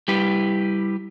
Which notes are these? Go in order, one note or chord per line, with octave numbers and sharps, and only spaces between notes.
G3 E4 G4 B4